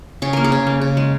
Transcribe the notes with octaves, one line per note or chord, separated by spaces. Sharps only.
C#3 G#4
A#3 A#4
G#4
C#3
A#3
C#3
G#3